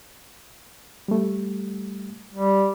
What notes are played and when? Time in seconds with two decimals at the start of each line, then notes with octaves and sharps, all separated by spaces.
1.08 G3 A3
2.33 G3